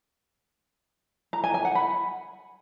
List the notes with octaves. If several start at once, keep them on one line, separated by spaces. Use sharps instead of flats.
A#5
G#5
G#5
F#5
B5